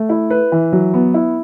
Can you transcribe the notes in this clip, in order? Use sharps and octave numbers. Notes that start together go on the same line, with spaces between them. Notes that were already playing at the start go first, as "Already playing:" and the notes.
Already playing: A3
E4
B4
E3
F#3
B3
E4